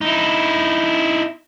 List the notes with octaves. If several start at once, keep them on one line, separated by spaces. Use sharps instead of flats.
D#4 E4